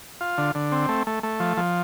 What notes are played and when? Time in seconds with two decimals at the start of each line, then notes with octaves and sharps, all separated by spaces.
0.21 F4
0.38 D3
0.55 D3
0.72 C4
0.89 A3
1.07 A3
1.23 A3
1.40 F3
1.57 F3